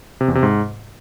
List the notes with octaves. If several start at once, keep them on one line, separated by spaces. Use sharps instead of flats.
C3
E2
C3
G#2